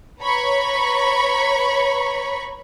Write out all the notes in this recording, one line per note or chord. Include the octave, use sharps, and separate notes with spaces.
B4 C#5 A#5 B5 C#6